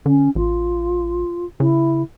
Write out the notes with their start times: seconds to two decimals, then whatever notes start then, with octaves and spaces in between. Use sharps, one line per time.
0.06 D3 C#4
0.35 A1 F4
1.60 C#3 E4